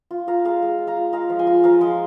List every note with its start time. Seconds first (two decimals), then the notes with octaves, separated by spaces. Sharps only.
0.11 F4
0.27 F4 F5 A#5
0.45 G#3 F5 A#5
0.62 G#3
0.78 F4
0.87 F5 A#5
0.97 F4
1.13 G#3 F5 A#5
1.29 F3
1.39 G#5 C6
1.47 F4
1.64 F3 F5 A#5
1.81 G#3 G#5 C6